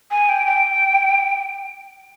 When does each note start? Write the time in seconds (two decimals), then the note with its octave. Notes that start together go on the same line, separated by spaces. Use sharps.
0.11 G#5
0.29 G5
0.47 G5